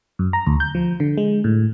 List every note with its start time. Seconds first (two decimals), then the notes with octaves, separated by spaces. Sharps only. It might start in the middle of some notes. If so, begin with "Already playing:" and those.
0.19 F#2
0.33 A#5
0.47 D2
0.60 G6
0.75 F3
1.00 D3
1.18 G#3
1.44 A2